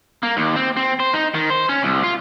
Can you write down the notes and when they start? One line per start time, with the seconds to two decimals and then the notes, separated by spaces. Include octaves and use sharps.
0.23 A#3
0.37 D#2
0.56 C4
0.77 C4
1.00 C5
1.14 D#4
1.35 D#3
1.50 C5
1.69 C#4
1.83 C2
2.03 F4